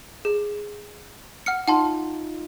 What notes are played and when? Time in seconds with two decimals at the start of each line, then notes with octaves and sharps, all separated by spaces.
0.25 G#4
1.46 F#5 F6 C#7
1.68 D#4 F4 F#5 A5 C6